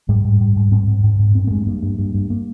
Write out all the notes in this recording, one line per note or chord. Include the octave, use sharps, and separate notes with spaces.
G#2 G3
G#2
G#2
G#2
G#2 C4
G#2
G#2
G#2
G2 C4
A#3
G2 G#3
G2 A#3
G2
G2
G2
A#3